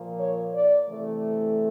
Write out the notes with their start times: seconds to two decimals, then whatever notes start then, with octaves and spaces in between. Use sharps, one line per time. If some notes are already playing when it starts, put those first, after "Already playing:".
Already playing: A#2 F3 A#3
0.18 C#5
0.52 D5
0.86 C3 E3 A3